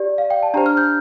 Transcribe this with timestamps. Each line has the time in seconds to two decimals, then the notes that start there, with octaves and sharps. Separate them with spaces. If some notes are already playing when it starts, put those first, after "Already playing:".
Already playing: G4 D5
0.18 F5
0.30 G5
0.43 A5
0.54 D4 G4 C5 A#5
0.66 F6
0.77 G6